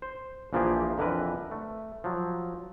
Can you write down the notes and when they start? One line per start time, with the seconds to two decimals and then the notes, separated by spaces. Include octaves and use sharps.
0.02 C5
0.53 A#1 E3 F3 A#3 G4 G#4
0.98 F2 D3 E3 A#4 B4
1.51 A3
2.04 F3 F#3